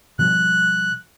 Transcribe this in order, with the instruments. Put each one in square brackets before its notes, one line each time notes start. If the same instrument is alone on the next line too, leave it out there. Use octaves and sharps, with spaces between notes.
[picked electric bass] B2 F3 G3 [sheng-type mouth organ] F#6